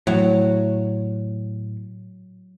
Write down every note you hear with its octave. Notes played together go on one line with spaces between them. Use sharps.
A2 F#3